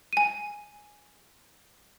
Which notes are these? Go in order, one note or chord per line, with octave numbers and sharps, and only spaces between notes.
G#5 D#7